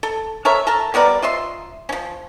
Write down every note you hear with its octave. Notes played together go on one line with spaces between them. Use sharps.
A4
A4 A#4 C#5 E5
A4 A#4 A5
G3 B3 A#4 D5
F4 D#5 E5 C6
F3 C#4